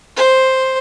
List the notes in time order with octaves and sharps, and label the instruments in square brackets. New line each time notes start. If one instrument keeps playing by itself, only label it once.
[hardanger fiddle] C5